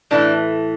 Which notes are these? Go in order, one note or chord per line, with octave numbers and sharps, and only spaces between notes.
A2 E3 A3 D4